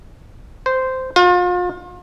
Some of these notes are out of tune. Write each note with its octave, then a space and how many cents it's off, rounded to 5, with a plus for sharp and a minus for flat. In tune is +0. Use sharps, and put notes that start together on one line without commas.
C5 -10
F4 +35